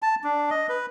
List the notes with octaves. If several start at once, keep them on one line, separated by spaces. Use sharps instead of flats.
A5
D4
D#5
B4